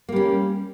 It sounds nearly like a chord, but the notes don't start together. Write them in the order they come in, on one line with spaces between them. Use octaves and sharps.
A#3 G3 C#4